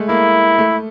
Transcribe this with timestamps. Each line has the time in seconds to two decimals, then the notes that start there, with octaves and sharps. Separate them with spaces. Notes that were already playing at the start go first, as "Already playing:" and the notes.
Already playing: G#3 A3
0.09 A#3 E4
0.58 A3